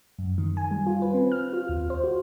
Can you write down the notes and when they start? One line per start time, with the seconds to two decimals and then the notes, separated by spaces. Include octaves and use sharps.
0.18 F#2
0.38 D#3
0.57 G#5
0.71 G3
0.87 F4
1.02 B4
1.14 C4
1.32 F6
1.53 F4
1.69 D#2
1.90 C5
2.04 F#4